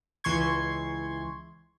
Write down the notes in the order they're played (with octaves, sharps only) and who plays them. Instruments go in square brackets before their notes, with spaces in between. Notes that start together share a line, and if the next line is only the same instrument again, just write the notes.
[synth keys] C#2 E3 C6 C#6 G#6